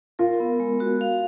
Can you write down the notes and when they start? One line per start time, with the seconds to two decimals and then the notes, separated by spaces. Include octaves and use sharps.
0.19 F4 A#4
0.40 B3
0.60 G#3
0.80 F#4
1.01 F5